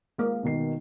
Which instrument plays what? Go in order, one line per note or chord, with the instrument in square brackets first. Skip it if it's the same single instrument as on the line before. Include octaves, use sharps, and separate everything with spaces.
[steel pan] G#3 A#3
[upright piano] B2 D#3 C7